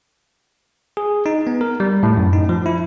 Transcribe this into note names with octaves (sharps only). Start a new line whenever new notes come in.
G#4
D#4
B3
A#4
G3
A2
F#2
D#4
F3
E4